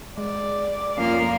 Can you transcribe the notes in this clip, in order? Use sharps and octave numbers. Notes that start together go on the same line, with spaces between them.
G#3 D5
F2 F3 A#3 C#4 F5